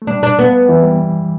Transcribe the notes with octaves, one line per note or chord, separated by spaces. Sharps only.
A3
G3 D4
D4
B3
E3
G3